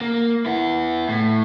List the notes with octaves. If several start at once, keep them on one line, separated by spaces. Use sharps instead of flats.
A#3
B3 E4
A2